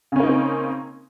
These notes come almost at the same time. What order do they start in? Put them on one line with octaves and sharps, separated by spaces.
C#3 C#4 A#3 D#4 C4